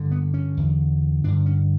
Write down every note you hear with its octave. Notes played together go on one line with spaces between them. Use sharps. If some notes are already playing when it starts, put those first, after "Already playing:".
Already playing: G2 D3
B3
C#4
E2 D3
G2 D3 D4
C#4